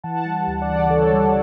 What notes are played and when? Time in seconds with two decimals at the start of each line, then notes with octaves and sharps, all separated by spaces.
0.04 E3 F#5 A5
0.25 G3
0.47 D2
0.62 D5 F#5
0.69 C#3
0.90 E3 A4 C#5
1.13 G3